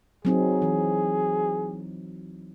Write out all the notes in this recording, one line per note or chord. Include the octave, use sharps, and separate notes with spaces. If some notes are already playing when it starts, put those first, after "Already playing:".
F#3 C4 D#4 G#4
E3